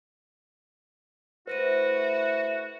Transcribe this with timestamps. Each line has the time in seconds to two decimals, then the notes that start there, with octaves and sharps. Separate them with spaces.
1.47 A3 E4 F#4 B4 C5 A#6 D#7